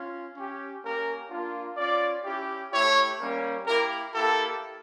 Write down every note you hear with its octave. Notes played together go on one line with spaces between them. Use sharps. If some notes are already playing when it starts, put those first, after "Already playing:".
Already playing: C#4 F4
C#4 G4
A#3 C#4 G4 A#4
A#3 D4 F4
C#4 F4 D5
C#4 E4 G4
A3 E4 G4 C#5
G3 A#3 C#4
A#3 E4 G4 A#4
A#3 E4 G4 A4